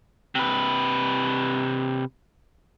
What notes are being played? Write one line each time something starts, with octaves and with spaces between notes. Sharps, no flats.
C3 B4